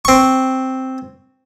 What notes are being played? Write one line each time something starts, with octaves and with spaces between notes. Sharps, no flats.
C4 C#6